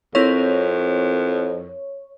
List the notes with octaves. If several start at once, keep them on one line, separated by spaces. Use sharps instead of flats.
F2 C4 E4 A#4 C#5